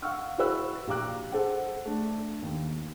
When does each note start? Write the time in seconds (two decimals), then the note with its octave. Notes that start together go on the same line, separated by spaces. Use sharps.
0.02 F5 F#5 C#6 E6 F6
0.38 E4 F#4 B4 E6 F#6
0.87 A#1 G4 F5 A#5 D6 F#6
1.32 G#4 A4 C5 F#5
1.86 A3 D4
2.42 D#2